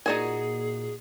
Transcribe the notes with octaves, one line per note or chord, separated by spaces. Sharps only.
A#2 D#4 F#4 G#4 A#4 D5 D#5 G#5